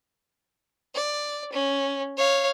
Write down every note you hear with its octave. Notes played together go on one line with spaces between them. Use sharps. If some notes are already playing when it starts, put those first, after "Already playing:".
D5
C#4
C#5 F5